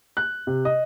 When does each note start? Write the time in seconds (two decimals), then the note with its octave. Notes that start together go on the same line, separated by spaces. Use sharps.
0.17 F#6
0.47 C3
0.65 D#5